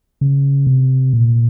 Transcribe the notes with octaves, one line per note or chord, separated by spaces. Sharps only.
C#3
C3
A#2